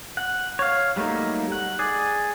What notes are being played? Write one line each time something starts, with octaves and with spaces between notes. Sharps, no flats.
F#5
C#5 F5
F#3 G3 A3 A#3 D#4
F#5
G#4 D5